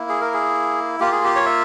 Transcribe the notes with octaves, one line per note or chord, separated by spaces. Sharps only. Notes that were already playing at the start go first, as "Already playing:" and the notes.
Already playing: A#3 E4
G#4
A#4
G#4
A#3 F4 G4
G#4
G4
C#5
E5